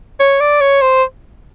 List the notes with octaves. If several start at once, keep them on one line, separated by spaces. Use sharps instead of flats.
C#5
D5
C#5
C5